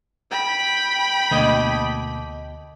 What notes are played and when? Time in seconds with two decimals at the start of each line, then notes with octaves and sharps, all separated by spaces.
0.31 G5 B5
1.31 D2 B2 A#3 D#5